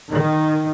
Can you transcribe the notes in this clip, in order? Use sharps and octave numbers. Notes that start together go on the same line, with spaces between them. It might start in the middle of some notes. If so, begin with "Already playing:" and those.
D#3